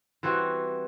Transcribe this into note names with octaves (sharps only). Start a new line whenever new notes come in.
E3 G3 C4 F#4